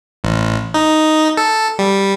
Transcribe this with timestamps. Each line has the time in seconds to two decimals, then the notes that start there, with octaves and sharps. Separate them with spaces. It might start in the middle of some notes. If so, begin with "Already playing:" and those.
0.24 A1
0.74 D#4
1.37 A4
1.79 G3